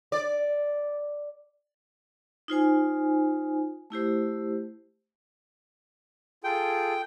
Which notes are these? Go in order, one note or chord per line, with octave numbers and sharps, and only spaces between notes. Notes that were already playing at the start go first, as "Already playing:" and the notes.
D5
D#4 F4 C5 G#5
A3 E4 G4 C5
F4 G#4 A4 G5